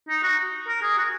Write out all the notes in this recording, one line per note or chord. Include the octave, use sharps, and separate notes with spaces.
D#4
F#4
A#4
G#4
F#4